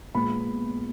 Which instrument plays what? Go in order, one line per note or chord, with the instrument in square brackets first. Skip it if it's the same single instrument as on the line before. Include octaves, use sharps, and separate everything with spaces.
[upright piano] A#1 A#2 G#3 B3 B5